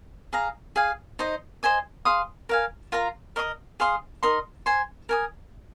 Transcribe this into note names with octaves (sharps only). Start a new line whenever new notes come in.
G#4 F5 A#5
G#4 F5 G#5
D#4 C5 D#5
C5 D#5 G#5 D#6
G#4 F5 C6 D#6
A#4 F5 G#5
F4 A#4 F5 A#5
A#4 D#5 C6 D#6
G#4 F5 C6 D#6
D#4 A#4 D#5 C6
C5 G#5 C6
A#4 G#5 D#6